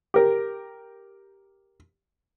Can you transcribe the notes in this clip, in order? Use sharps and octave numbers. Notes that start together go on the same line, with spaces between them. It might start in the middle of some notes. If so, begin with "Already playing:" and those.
G4 A#4